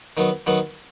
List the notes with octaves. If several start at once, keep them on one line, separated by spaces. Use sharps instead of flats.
D#3 F#3 B3
D#3 F#3 B3